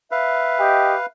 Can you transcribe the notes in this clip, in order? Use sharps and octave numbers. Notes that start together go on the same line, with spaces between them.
B4 E5 F5
G4 D#5 G5